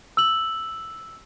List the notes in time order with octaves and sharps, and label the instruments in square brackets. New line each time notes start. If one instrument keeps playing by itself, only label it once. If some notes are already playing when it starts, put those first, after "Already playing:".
[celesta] E6 F#7